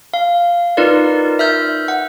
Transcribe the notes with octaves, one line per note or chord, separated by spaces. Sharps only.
F5
D#4 F4 A#4 B4 D5
E5 F6 G6
F#5